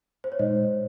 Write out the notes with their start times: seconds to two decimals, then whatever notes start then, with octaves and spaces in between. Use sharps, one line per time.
0.24 C5
0.32 C#5
0.39 A#2 G#3 D#4 C5 D#5